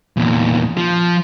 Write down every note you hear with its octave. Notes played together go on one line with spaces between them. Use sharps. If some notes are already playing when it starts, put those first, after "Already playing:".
E2 A#2
F3